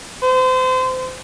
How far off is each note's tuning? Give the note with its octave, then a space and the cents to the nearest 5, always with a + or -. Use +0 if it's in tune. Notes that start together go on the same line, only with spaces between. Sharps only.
C5 -30